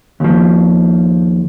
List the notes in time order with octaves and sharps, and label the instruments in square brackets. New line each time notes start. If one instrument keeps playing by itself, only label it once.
[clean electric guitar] D#2 F3